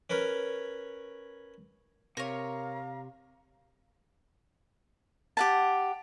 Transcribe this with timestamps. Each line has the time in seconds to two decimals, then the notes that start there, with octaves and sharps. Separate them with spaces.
0.10 C#4 A#4 B4 C#5
2.17 C3 A#4 C#5 F5 A#5
5.37 G4 F#5 A5